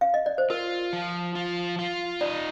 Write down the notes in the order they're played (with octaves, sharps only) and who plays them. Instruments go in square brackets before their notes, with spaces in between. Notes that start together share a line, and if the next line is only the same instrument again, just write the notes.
[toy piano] F5
D#5
D5
C5
[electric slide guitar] F4 [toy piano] A#4
[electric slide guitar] F3
F4
F4
[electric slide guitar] D#4 [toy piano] D5